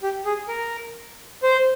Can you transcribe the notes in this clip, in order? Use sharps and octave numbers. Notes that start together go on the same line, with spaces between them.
G4
G#4
A#4
C5